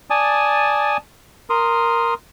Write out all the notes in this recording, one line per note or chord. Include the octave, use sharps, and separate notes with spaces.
D5 G#5 A5 D#6
A#4 C6 D#6